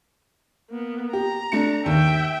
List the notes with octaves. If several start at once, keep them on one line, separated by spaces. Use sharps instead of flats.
A#3 B3
G4 A#5
A3 D4 C#7
D#2 E5 G5